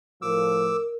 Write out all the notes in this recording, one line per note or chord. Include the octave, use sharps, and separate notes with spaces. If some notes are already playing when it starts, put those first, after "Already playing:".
A2 F3 A#4 D6 E6